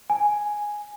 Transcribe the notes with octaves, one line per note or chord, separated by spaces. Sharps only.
G#5